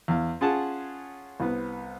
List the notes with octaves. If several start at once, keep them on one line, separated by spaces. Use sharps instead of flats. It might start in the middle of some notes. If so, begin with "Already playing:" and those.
E2 F5
C#4 F4 G#4 F#5 A5
C2 B3